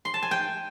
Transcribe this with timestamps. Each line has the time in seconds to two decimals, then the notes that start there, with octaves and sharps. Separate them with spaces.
0.05 C6
0.14 A5
0.23 G#5
0.31 G5